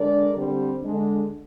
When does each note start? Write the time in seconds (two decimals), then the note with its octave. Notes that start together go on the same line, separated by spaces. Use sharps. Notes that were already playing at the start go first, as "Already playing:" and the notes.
Already playing: D3 G#3 D4 A#4 D5
0.36 D3 G3 C4
0.83 D3 G#3 D4